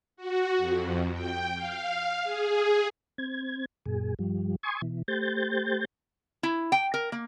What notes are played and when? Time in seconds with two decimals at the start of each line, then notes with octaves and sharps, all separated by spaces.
0.17 F#4
0.58 F2
1.12 G5
1.56 F5
2.23 G#4
3.18 C4 G#6
3.86 F#2 A#2 G#4
4.19 G2 F3 G3
4.63 G#5 C6 C#6 D#6 G#6
4.82 B2 E3
5.08 A3 G4 C5 G6 A6
6.43 E4
6.72 G5
6.94 A#4
7.12 A#3